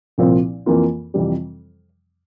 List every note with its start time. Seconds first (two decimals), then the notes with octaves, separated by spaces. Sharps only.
0.18 C2 A#2 F3 C4
0.66 F2 E3 A#3 F4
1.14 F2 C3 E3 G3